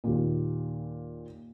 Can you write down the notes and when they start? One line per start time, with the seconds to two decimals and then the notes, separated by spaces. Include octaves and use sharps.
0.04 D#2 A#2